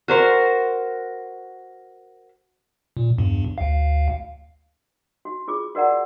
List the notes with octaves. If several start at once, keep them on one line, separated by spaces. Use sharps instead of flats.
F#4 A#4 C5
A#2
E2 G2
D2 F5
F#4
F4 G#4 D6
F#4 A#4 D5 F#5 A#5